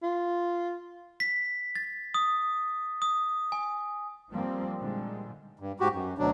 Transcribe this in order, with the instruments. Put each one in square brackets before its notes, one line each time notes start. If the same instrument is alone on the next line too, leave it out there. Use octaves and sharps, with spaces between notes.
[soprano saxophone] F4
[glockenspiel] B6
A6
D#6
D#6
G#5
[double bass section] F3 G3 A#3 C4
A#2 D3 D#3 G3 G#3
[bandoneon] G2
G#2 F#4 G4
F#2
D2 B2 F#3 D4